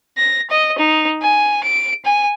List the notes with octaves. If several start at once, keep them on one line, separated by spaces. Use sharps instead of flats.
A#6
D#5
D#4
G#5
D7
G#5